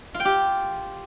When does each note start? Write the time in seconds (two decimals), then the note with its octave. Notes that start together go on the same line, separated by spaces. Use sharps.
0.14 F4
0.20 G5
0.25 G4